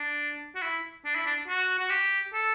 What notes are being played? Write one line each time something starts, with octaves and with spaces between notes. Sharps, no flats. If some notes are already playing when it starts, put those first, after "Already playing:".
Already playing: D4
F#4
E4
D4
E4
D4
F#4
F#4
G4
A4